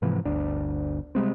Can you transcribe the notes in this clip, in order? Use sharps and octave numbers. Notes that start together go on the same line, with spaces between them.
G#2 C3 E3 F3
G1 D2 D4
C3 G3 G#3 C4